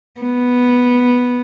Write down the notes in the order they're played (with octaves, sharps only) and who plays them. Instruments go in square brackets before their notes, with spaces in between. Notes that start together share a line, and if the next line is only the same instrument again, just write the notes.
[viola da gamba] B3